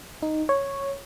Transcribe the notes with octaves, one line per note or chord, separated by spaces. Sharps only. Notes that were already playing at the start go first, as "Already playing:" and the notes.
D#4
C#5